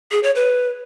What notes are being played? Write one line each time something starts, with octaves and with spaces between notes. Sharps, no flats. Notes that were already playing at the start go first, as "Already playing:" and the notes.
G#4
C#5
B4